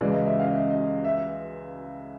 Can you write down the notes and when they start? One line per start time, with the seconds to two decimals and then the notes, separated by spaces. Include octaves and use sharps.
0.01 C#2 C#3 E3 G#3 D5
0.14 D#5
0.27 E5
0.40 F5
0.47 D#5
0.53 E5
0.70 D#5
1.04 E5